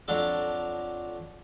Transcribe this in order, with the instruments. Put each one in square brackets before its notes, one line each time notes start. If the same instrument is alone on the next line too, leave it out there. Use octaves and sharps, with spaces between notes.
[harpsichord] F2 F#3 D4 A4